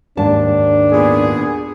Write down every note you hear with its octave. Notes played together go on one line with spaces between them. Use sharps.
D#2 G#2 D4 A5
A#2 B3 G#4